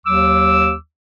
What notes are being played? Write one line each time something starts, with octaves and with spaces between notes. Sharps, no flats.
D#2 F#3 D6 E6